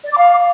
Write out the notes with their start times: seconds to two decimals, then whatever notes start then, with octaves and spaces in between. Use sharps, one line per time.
0.04 D5
0.11 D6
0.18 F5